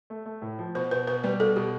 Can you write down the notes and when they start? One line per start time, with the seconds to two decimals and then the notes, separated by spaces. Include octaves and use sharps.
0.10 A3
0.26 A3
0.42 A2
0.59 F3
0.74 B2 C5
0.91 B2 B4
1.07 B2 B4
1.24 G3 B4
1.40 B2 A4
1.56 B2 G4